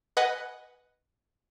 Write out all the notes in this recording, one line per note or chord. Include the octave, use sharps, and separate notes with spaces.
B4 D#5 F#5 G#5